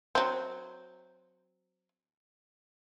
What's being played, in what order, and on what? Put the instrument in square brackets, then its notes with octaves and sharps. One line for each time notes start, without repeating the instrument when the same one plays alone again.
[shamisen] F#3 C4